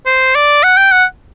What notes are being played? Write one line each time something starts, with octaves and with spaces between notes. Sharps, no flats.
C5
D5
F#5
G5
F#5